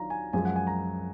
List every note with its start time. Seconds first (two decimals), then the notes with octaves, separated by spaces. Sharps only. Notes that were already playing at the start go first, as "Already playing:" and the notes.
Already playing: D#3 F#3 D4 F4 A#5
0.10 G#5
0.33 F#2 F3 G#3 G#5
0.45 F#5
0.56 G#5
0.67 A#5